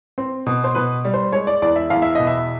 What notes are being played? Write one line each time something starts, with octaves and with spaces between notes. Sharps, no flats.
C4
B2
C5
B2 B4
G3
C5
G#3 C#5
D5
E2 D5
E5
E2 F5
E5
B2 D#5
E5